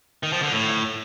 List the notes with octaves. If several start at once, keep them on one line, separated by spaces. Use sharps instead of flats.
D#3
F3
D3
A2